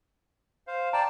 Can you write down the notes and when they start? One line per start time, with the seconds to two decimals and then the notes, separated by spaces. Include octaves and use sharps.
0.67 C5 F5
0.93 D5 G5 A5 A#5